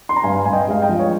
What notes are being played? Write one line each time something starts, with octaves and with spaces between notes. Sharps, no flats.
C6
A#5
G2 F5 G#5
G2 G#5
D#5 G5
G#3 F5
D#5 G5
F3
C#5